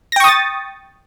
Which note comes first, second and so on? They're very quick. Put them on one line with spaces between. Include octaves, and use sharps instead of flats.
A#6 G5 C#6 D#6 A6